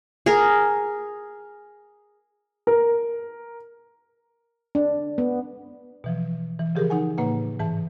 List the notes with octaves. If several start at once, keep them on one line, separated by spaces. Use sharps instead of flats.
G#4 A#4
A#4
D4
B3
B2 E3 F3
E3
C#3 F3 G4 G#4 A#4
D#4 F#5 G#5
A2 C#3 A#3 B4 F#5
G#2 E3 A5